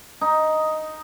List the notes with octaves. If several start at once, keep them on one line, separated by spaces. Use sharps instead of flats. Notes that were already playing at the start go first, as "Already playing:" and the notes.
D#4